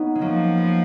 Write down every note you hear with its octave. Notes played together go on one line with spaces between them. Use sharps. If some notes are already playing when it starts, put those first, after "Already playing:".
Already playing: B3 C#4 D#4 F4
G#3
F3 F#3 A#3
G#3 B3